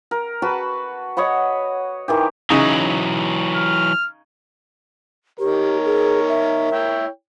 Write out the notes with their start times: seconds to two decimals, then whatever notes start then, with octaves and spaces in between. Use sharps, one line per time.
0.11 A#4
0.42 F#4 B4 A5 B5
1.17 C#5 D#5 F#5 B5
2.08 D#3 E3 G4
2.50 C#3 E3 F#3 D#4
3.56 F6
5.39 D#3 G4 A#4 C#5
5.85 G#4
6.28 E5
6.72 E4 C#5 G5